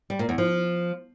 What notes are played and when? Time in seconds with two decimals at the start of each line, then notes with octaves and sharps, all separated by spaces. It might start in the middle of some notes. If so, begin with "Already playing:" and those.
0.10 G3
0.19 A#2
0.29 E2
0.38 F3